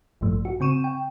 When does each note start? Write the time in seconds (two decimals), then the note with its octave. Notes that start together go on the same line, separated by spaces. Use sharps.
0.21 A1 G2 F3 A3
0.45 F#4
0.60 C#3 C4 C#6 D#7 E7
0.84 G5